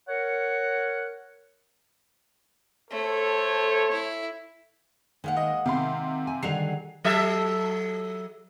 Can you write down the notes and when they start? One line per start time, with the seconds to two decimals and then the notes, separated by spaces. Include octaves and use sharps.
0.08 A#4 C#5 F#5
2.91 A3 A4 C5 C#5
3.92 E4
5.24 D#3 G#3 A#3 F#5
5.37 D#5
5.66 C3 D#3 F5 C6
6.27 G#5
6.43 D3 D#3 F#3 G3 G#4 F#5 C7 F7
7.04 F#3 A4 E5